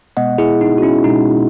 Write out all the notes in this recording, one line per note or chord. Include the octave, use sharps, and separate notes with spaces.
B2 G#3 B3 D#5 F#5
E4 G#4
D#4
F#4
C#4 E4
B2 G#3 B3 D#4